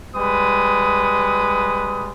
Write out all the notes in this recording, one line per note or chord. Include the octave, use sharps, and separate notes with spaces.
G3 G#3 B4 D#6